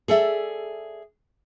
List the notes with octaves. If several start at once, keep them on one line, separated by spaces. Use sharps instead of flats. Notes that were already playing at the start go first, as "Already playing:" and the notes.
G#4 A4 D5 E5